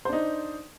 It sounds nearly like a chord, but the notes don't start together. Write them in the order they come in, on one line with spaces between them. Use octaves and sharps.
C5 D4 D#4